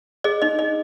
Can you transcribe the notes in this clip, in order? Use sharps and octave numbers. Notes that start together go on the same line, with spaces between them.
G#4 D#5
D#4 D#5
D#4 D#5